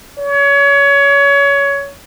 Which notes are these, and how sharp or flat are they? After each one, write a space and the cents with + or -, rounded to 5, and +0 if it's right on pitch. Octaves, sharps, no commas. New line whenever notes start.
C#5 +25